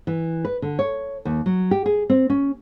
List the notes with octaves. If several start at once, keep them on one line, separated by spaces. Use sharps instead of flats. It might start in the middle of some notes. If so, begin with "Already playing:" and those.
E3
B4
D3
C#5
D#2
F#3
G4
G#4
C4
C#4